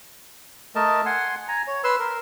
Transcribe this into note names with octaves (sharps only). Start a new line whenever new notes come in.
A3 A#4 D#5 A5
F#5 G#5 C6
G#5 A#5
C#5
B4 C6 E6
A#4